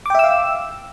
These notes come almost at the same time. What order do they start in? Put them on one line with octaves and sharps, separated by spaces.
D6 G5 E5 E6 F5